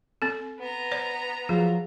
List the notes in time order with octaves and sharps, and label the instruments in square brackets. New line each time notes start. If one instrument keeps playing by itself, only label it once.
[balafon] C4 A4
[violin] B3 A#5
[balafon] C5 D5
[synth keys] F3 F#3 F4 [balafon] G#4